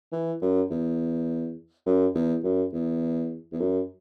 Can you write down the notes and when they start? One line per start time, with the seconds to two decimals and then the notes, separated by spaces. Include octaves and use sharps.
0.12 E3
0.42 F#2
0.70 E2
1.86 F#2
2.15 E2
2.44 F#2
2.73 E2
3.53 E2
3.60 F#2